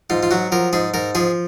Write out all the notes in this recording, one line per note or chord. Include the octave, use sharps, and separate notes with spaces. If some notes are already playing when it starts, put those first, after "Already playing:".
G#2 F4
F4
F#3 F#4
F3 A#4
G#2 G#4
G#2 A#4
F3 G#4